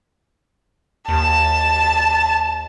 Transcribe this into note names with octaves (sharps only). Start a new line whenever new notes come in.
D#2 A5